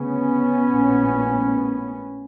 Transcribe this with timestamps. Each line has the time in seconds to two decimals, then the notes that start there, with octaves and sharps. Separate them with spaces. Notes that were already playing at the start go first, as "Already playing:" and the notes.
Already playing: D2 C#3 B3 C#4
0.67 A#1 A2